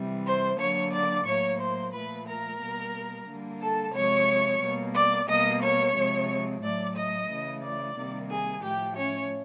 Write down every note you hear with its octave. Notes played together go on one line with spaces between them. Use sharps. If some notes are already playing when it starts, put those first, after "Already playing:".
Already playing: C3 E3 G3
C5 C6
D3 F#3 A#3 C#5 C#6
D5 D6
A2 F#3 A#3 C#5 C#6
C5 C6
A#2 F3 A3 B4 B5
A#4 A#5
B2 G3 A#3
D3 G3 A#3
A4 A5
C3 F3 G#3 C#5 C#6
B2 G3 A#3
D5 D6
B2 G3 A#3 D#5 D#6
C#5 C#6
C3 F3 G#3
A2 F#3 A3 D5 D6
D#5 D#6
C#3 E3 A3
D5 D6
C3 D#3 G3 A#3
G#4 G#5
A2 F3 A3 G4 G5
C#4 C#5